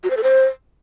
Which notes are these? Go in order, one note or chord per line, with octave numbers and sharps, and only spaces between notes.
F#4
C5
A4
C5